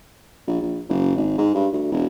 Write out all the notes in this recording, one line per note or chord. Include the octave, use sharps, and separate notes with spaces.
A#1
A#1
F#1
G#1
G#2
G2
D2
E1